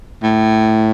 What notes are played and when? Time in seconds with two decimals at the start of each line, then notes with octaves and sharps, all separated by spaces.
0.23 A2